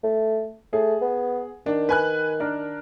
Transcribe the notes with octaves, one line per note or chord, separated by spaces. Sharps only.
A3
A3 G#4
B3
D#3 D4
B4 G#5 F#6
D4 A#4